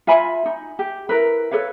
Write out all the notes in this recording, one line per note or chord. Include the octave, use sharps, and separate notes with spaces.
F4 E5 G#5 B5
D#4
G4
E4 A#4 B4
A4 B4 C#5 F5